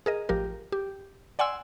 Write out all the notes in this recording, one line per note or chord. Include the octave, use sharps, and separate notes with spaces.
G#4 A#4 D#5
A1 F3 G4 A#4
G4
D5 F#5 G#5 C6 E6